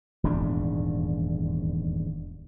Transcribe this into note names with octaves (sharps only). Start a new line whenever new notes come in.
D#1 E2 G#2 D4